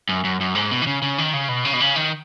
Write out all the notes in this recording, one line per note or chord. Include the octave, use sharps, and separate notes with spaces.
F#2
F#2
F#2
G#2
B2
D#3
C#3
C#3
D#3
C#3
B2
C#3
B2
C#3
D#3